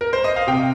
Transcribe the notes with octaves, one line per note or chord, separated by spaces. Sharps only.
A#4
C5
D#5
F5
C3 G5